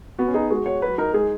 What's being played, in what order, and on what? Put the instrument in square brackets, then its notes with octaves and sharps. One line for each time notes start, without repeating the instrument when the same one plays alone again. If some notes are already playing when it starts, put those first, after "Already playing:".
[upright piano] B3 [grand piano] F#4
[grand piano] C#4
[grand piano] D#4 [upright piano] G#4
[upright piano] G#3 [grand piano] F#4
[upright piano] F#4 [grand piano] C#5
[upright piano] F#3 [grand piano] B4
[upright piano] D#4 [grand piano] A#4
[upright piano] G#3 [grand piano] G#4